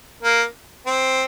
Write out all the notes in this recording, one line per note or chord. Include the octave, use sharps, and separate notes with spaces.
A#3
C4